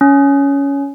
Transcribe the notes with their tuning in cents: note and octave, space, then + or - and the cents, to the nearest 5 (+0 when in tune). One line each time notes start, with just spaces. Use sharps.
C#4 +15